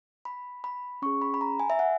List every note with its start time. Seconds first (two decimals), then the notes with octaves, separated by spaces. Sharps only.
0.25 B5
0.64 B5
1.02 C#4 G#4 C#6
1.22 B5
1.34 B5
1.41 A#5
1.60 G#5
1.70 E5
1.79 F#5